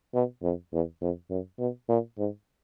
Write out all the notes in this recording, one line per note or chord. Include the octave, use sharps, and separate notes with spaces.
B2
F2
E2
F2
F#2
B2
A#2
G#2